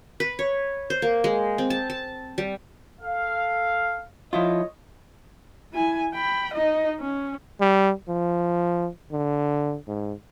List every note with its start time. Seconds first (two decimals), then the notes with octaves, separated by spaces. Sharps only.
0.20 B4
0.39 C#5
0.90 C5
1.02 A#3
1.24 G#3
1.58 C4
1.70 A5
1.90 A5
2.38 G3
3.01 A4 F5
4.33 F3 E4 F4 C#5 D#5
5.73 E4 G#5
6.14 G5 B5
6.54 D#4 D#5
7.00 C#4
7.61 G3
8.08 F3
9.12 D3
9.88 G#2